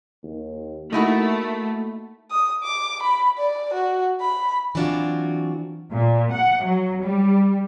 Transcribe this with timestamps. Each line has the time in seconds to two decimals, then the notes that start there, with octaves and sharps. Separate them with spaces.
0.23 D#2
0.93 A3 A#3 D#4 E4 F#4
2.31 D#6
2.64 D6
3.03 B5
3.38 D5
3.74 F#4
4.21 B5
4.75 E3 F#3 C4 D4 F4 F#4
5.92 A#2
6.33 F#5
6.64 F#3
7.04 G3